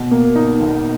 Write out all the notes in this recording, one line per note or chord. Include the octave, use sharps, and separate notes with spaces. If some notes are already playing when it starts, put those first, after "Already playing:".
Already playing: B2
A#3
D#4
B1